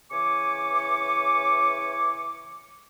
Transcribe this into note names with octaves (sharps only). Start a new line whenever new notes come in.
C#3 E3 G#5 C#6 D6